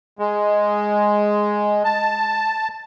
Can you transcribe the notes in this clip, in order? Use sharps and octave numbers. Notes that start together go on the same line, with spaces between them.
G#3
A5